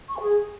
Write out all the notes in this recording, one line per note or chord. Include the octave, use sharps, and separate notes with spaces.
C#6
G#5
G#4